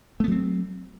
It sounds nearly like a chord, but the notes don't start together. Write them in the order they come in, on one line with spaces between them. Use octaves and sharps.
A3 B3 F#3 C4